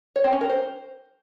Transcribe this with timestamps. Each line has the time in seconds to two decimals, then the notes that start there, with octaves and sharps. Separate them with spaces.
0.16 C#5
0.24 C4
0.33 C#4
0.41 A#4
0.49 C5